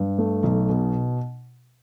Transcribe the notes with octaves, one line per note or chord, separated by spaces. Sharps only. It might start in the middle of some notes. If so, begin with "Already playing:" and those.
Already playing: G2
A3
B1
B2